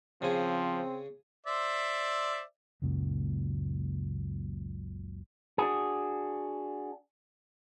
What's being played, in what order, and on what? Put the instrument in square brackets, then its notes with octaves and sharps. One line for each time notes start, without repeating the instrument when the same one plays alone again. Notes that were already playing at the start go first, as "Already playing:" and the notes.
[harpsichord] C#3 G#4 [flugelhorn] F3 [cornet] C4
[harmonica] C5 D5 E5
[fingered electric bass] F#1 C#2 F#2 A#2
[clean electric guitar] D4 F#4 G#4